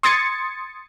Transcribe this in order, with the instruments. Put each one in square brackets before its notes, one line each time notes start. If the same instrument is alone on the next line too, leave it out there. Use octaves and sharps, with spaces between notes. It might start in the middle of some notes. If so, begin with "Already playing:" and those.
[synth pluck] C6 D#6 G#6 A6 C#7